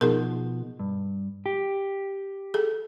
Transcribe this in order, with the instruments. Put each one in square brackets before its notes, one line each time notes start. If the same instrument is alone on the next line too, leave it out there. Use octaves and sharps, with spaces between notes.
[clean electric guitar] B2 F3 [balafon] D#4 G#4 A#4
[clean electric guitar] G2
G4
[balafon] G#4 A4